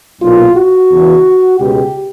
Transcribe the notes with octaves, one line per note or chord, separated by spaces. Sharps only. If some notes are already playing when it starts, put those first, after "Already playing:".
B1 A#2 F#3 A#3 F4
F#4
E2 C#3 E3
C#2 B2 G#3 G4